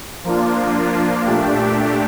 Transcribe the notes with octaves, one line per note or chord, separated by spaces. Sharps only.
F3 A#3 D4 F4
A#2 A3 D4 G4